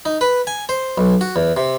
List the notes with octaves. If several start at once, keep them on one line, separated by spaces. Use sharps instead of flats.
D#4
B4
G#5
C5
B1
F#4
E2
C3